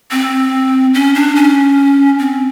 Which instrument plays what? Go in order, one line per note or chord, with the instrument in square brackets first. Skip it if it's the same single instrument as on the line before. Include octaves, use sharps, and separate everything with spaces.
[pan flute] C4
C#4
D4
C#4
C4